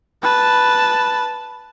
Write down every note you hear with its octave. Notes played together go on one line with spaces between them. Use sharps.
B4 A5